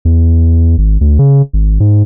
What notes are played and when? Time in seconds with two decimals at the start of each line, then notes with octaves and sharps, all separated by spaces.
0.05 E2
0.78 G#1
1.01 D2
1.19 C#3
1.53 G#1
1.80 G#2